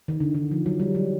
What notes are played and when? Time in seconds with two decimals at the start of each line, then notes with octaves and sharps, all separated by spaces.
0.08 D#3
0.20 D3
0.35 D#3
0.51 F3
0.66 F#3
0.80 G3
0.95 F#3